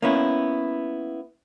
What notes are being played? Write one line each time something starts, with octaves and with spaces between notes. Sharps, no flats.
A#3 B3 C#4 E4